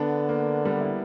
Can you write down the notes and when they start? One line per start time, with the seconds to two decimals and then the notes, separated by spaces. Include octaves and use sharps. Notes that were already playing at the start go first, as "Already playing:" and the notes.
Already playing: D3 B3 D4
0.29 A#3
0.65 G3 B3
0.80 E4